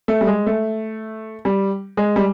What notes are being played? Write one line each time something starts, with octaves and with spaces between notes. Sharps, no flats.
A3
G3
G#3
A3
G3
G#3
G3